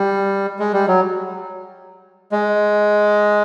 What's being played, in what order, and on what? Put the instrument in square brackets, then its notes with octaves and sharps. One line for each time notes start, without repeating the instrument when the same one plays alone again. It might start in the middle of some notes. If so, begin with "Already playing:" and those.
Already playing: [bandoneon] G3
G#3
G3
F#3
G#3